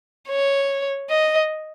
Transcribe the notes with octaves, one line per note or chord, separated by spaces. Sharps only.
C#5
D#5